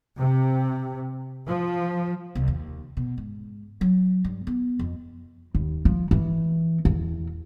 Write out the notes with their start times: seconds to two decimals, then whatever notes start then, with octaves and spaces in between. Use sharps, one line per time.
0.19 C3
1.47 F3
2.35 C2
2.48 D#2
2.97 B2
3.18 G#2
3.81 F#3
4.24 G2
4.47 B3
4.79 F2
5.55 D#2
5.85 F3
6.11 E3
6.85 E2